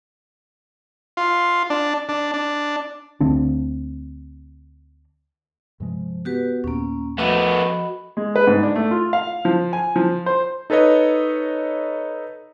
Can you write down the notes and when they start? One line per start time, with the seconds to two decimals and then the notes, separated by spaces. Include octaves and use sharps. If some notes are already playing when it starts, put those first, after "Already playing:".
1.17 F4
1.70 D4
2.09 D4
2.34 D4
3.21 D2 D3 C4 D4
5.80 G2 C3 F3 G#3
6.25 B3 F#4 G4 B4
6.64 D#2 A#2 A#3 C#4
7.19 F3 A3 B3 F#4 D#5 B5
8.17 G#3
8.36 B4
8.47 G#2
8.63 D4
8.76 A3
8.91 F4
9.13 F5
9.45 F3
9.73 G#5
9.96 F3
10.26 C5
10.70 D#4 A4 B4 C#5 D#5